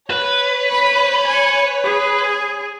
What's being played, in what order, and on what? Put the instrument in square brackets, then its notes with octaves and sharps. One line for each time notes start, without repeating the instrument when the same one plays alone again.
[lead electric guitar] B4 [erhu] C#5
[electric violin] B5
G#5 C#7
G#4